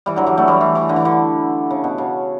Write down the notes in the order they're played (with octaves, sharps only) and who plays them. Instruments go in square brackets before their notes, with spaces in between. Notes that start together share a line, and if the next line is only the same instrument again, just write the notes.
[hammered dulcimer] E3 G3
D3 F#3
E3 G3
F#3 A3
E3 G3
E3
E3
D3
E3
D3
C#3
B2
C#3